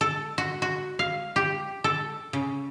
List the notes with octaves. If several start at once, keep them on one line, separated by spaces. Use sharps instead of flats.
A4
F#4
F#4
F5
G4
A4
C#3